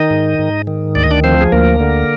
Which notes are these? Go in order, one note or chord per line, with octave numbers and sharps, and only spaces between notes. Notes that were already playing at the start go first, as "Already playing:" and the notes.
Already playing: D#3 D#4 D#5
G#2
G#2
D#3
D2 D5
D#5
D4 D5
F3 C4 C5
G#4
D2 A#3 A#4
D3